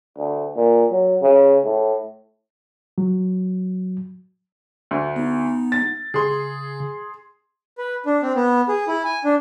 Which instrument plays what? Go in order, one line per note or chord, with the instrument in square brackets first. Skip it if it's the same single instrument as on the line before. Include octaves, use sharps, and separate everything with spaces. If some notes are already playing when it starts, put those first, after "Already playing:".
[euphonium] D2
A#2
F#3
C#3
A2
[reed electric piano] F#3
[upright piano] D2
[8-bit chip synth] B3 D#4
[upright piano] A6
[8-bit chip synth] C#3 [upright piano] G#4 C6
[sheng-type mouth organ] B4
D4
C4
B3
G#4
E4
G#5
D4